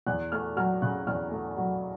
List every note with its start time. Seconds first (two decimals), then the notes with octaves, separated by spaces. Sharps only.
0.07 E2 F#6
0.32 A3 F6
0.56 F#3 F6
0.82 C#3 F#6
1.07 E2 F6
1.31 A3
1.57 F#3